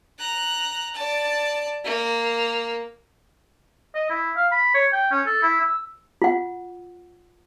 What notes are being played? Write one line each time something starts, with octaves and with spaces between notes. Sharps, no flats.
A#5 F#6
D5 A5
A#3
D#5
E4
F5
B5
C#5
G5
C#4
A4
E4
E6
F4 F#5